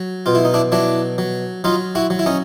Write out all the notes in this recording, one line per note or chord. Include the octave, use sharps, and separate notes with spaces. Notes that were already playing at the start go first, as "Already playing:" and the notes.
Already playing: F#3
B2 F4
E4
D#4
D4 E4
F#3 D4 E4
F#3
F#3 D#4 F4
E4 F#4
F#3
E4
C#4 D#4